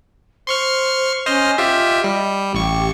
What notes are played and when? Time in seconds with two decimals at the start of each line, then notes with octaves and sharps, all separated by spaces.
0.47 C5 C6 C#6 F6
1.26 C#4 C5 D#5 F6
1.58 F4 G4 D#5 E5
2.04 G3
2.55 A1 G4 C#6